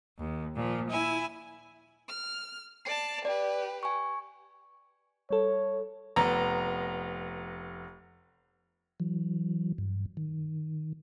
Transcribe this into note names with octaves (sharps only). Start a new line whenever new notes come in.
D#2
A#2 F3
E4 G#5 E6
F6
D5 A5 C7
G4 B4 D5
G#5 C#6
G3 A4 C#5
F1 B3 A#5
E3 F#3
G2
D#3